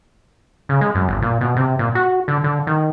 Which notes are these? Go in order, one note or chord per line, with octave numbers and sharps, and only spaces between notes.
C#3
G#3
F#2
G1
A#2
B2
C3
A#2
F#4
D3
D3
D#3